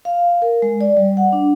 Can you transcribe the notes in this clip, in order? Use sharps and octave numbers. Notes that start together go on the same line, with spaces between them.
F5
A#4
G#3
D5
G3
F#5
D4